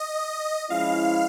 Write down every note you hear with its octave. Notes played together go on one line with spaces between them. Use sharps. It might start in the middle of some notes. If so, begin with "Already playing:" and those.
Already playing: D#5
F3 G#3 C#4 E4 F5